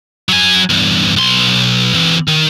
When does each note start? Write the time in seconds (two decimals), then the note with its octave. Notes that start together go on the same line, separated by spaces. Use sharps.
0.29 F#3 G#5
0.70 E2 G2
1.16 B1 C6
1.94 E3 C4
2.28 D#3